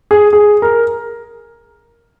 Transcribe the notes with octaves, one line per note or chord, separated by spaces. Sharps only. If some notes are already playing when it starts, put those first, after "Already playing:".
G#4
G#4
A#4